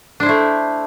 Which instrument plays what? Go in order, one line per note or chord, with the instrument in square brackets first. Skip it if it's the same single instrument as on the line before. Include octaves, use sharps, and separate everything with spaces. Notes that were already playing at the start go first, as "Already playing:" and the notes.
[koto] D4
C5
E4
A3